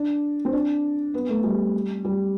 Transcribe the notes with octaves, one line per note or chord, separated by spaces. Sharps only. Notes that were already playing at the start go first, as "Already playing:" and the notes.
Already playing: D4
C4
D4
B3
A3
G3
G3